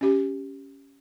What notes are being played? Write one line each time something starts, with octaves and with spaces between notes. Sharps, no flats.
C#4 G4